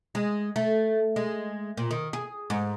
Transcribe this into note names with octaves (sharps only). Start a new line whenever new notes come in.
G#3
A3
G#3
A#2
D#3
G#4
G#2